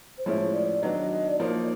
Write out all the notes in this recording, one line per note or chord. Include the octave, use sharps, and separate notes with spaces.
C5
A2 F3 G#3 C#4 E4 C#5
D5
D#3 F#3 B3 D4 D#5
D#5
D5
F3 A#3 D#4 C#5